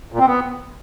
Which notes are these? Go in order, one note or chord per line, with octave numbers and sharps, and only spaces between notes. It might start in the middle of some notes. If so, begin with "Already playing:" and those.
A#2
C4
B3